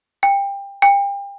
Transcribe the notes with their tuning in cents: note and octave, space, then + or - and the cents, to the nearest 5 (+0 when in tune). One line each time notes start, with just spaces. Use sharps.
G5 +25
G5 +35